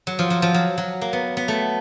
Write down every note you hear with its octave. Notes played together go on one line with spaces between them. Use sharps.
F#3
F3
F#3
F3
F#3
F#3
A#3
B3
B3
A3